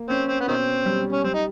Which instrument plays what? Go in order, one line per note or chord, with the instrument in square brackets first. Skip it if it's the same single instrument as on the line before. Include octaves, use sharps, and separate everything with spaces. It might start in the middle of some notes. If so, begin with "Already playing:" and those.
Already playing: [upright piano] A#3
[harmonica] C4 [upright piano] C#4
[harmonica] C4
B3
[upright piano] B2 [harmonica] D#3 C4
[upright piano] G3
[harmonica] C#4
[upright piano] G3 [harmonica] C4
[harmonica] D#4